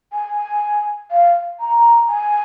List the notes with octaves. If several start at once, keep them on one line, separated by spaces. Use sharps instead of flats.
G#5
F5
A#5
G#5